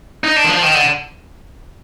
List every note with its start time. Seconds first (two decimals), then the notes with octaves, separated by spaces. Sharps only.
0.24 D#4
0.36 D4
0.44 D#3
0.49 F3
0.63 D#3
0.75 D3